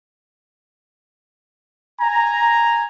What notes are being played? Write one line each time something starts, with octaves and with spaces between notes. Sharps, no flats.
G#5 A#5